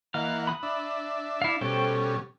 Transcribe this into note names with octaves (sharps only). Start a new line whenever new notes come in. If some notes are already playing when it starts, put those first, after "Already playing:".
E3 A#3 D#5 F5 F#5 F6
B5 D#6 F#6
D4 E5
E4 F5
B2 G3 C#4 A4 C5 G5